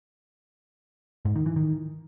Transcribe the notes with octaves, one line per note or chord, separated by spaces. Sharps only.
G#2
D#3
E3
D#3